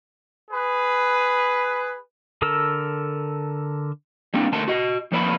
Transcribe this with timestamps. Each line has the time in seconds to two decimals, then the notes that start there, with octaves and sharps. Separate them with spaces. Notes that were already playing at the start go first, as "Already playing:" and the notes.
0.51 G#4 B4
2.42 D3 A4 A#4 E6
4.34 G3 A#3 C4 D4
4.52 D2 A3 A#4 A5 C6
4.68 F#4 D#5
5.12 F2 F3 A#3 B4 D5 B5